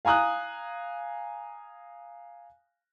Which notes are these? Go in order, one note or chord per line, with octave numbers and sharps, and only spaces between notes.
F5 G#5 A#5 D#6 F#6